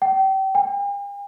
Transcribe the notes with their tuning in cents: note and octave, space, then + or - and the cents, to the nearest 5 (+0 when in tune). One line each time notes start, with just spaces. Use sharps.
G5 -30
G5 +45